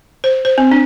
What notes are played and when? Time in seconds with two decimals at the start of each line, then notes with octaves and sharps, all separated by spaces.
0.24 C5
0.45 C5
0.58 C4
0.71 D4